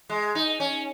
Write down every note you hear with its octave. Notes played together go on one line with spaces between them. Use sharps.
G#3
D#4
C#4